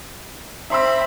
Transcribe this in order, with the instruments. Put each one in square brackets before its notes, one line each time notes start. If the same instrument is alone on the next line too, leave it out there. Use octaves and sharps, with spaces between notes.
[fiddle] C4 B5 [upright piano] E5 C6 E6